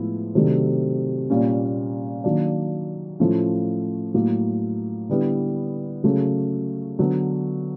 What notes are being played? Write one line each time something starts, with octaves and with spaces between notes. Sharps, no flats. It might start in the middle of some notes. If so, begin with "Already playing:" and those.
Already playing: A2 F3 G#3 B3 E4
C3 D#3 F#3 A3 D4
A#2 G3 A#3 C#4
D#3 F#3 A#3 D4
A2 F3 A3 C#4 E4
A2 F#3 A#3
D3 G3 B3 E4
C#3 F#3 A3 C#4
D3 F#3 B3 D4